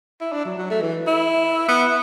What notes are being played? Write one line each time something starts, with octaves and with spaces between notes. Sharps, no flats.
E4
D4
F#3
F#3
A3
E3
E4
B3